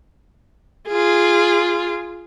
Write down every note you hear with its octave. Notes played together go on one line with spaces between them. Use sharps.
F4 G#4